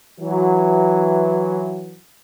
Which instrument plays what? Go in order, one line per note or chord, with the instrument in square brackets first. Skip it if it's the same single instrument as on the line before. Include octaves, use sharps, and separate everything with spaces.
[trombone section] E3 F#3